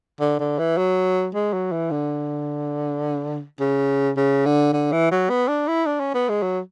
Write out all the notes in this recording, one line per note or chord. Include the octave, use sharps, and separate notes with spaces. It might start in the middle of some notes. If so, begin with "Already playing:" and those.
D3
D3
E3
F#3
G#3
F#3
E3
D3
C#3
C#3
D3
D3
E3
F#3
B3
D4
E4
D4
C#4
B3
G#3
F#3